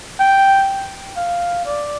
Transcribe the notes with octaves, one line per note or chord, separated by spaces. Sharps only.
G5
F5
D5